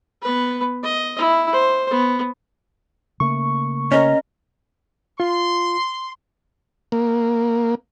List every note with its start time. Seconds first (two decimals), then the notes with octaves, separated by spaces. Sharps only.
0.22 B3 B4
0.83 D#5
1.18 E4
1.53 C5
1.91 B3
3.20 C#3 A3 A#3 C#6
3.92 C#4 A#4 D#5
5.20 F4 C6
6.92 A#3